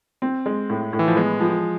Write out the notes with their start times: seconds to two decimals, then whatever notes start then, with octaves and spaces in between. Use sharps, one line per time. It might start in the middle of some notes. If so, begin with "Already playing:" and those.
0.22 C4
0.46 G#3
0.70 A2
0.93 A2
0.99 E3
1.08 F3
1.16 G#3 B3
1.40 F3